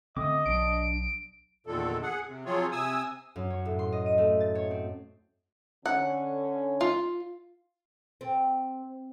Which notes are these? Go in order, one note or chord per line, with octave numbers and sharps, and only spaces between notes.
D3 A3 C4 D#5 D6 D#6
B1 F#3 D4 D7
E2 A#2 D3 D#3 A4
G#4 F#5
C3
F3 F#3 C4 F4 G#4 C#5
C3 G#5 D#6 E6
F#2
C#5
A2
C6
D#5
D#7
A3
A6
C#5
C4
D3 C#4 F#5
F4
C4